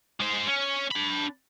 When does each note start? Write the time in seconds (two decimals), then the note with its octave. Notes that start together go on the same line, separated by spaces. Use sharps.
0.20 G#3 C5
0.47 C#4
0.91 D4 B5